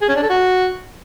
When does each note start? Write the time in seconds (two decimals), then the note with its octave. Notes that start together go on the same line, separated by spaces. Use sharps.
0.02 G#4
0.09 C#4
0.16 D4
0.23 A4
0.30 F#4